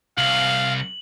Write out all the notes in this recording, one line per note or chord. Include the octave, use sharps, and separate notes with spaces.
C2 F5 F#7